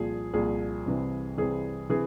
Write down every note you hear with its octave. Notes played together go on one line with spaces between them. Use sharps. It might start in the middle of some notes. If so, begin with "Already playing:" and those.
Already playing: C2 A#2 F3 G#4
C2 A#2 F3 G#4
C2 C3 E3
C2 C3 E3 G#4
C3 E3 G#4